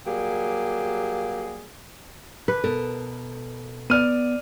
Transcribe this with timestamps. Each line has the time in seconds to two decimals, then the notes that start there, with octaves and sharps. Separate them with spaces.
0.06 F#3 G3 A#3 G4 G#4
2.48 D3 B4
2.64 B2 A4 A#4
3.90 B3 D5 F6 D#7